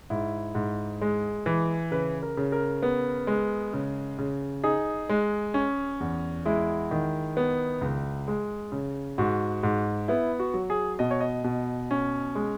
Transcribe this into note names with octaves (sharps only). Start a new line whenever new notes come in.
G#2 E4
G#2
G#3
E3
C#3 B4
A#4
C#3
A#4
B3
G#3
C#3
C#3
D#4 G#4
G#3
C#4
E2
G#3 E4
D#3
B3
C#2
G#3
C#3
G#2 F#4
G#2
B3 E4
F#4
F#3
G#4
B2 D#5
C#5
D#5
B2
C#4
G#3